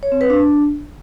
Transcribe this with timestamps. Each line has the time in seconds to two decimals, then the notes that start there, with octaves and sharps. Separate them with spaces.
0.03 C#5
0.12 C4
0.21 B4
0.30 D4